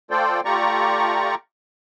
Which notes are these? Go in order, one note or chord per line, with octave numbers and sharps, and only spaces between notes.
A3 F4 A4 C5 D5 G5
A3 F4 G4 D5 A#5 C#6